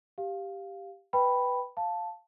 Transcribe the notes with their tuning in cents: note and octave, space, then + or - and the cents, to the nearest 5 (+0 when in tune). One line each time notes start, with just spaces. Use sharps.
G4 +0 F5 +0
B4 +0 G5 +0 B5 +0
F5 +0 A5 +0